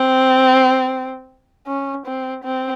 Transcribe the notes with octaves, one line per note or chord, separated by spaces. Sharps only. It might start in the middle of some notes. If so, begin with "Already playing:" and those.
Already playing: C4
C#4
C4
C4